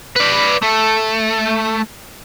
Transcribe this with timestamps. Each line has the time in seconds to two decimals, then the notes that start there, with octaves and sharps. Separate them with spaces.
0.16 B4 D5
0.62 A3